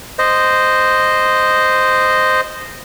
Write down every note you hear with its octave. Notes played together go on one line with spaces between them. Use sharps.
C5 D#5